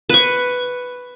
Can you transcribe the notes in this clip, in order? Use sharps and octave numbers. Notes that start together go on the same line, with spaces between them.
B4 C#6